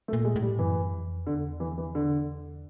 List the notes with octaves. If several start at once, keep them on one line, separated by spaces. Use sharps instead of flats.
A3
A#2
G#3
A2
G3
F#2 E3
F2
E2 D3
E3
E3
D3